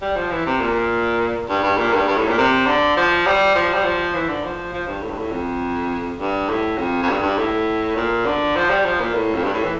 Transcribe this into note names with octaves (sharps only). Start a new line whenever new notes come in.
G3
F3
E3
C3
A#2
G2
G2
A#2
G2
G2
A2
A#2
C3
D3
F3
G3
F3
G3
F3
E3
D3
F3
F3
G2
A2
G2
A2
F2
G2
A2
F2
F2
G2
G2
A2
A#2
D3
F3
G3
F3
A#2
A2
F2
G2
A2
E3